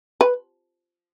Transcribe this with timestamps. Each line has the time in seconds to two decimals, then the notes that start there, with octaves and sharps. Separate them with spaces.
0.21 B4